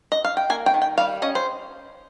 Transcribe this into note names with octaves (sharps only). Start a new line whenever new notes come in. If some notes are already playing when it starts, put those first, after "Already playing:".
D#5
F5
G5
A#3 G#5
G5
D#3
G5
G3 F5
C#4 D#5
C5